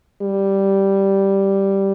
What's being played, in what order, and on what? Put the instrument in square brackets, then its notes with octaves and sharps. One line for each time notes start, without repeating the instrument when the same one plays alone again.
[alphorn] G3